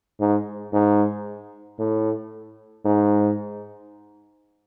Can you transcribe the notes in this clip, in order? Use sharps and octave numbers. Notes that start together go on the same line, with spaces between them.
G#2
G#2
A2
G#2